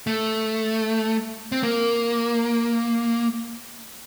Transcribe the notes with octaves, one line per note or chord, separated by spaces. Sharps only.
A3
C4
A#3